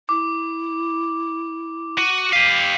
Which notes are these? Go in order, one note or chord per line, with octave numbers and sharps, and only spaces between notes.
E4 D6
F#4 D#7
G4 F5 B6 D#7